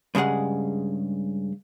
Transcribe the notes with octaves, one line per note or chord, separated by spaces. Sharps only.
G2 C#3 G#3 G#4 F#5